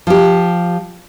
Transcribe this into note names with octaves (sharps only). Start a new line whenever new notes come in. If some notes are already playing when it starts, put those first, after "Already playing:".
F3 G4